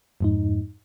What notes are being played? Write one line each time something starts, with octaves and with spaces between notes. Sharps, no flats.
F2 G#2 D#4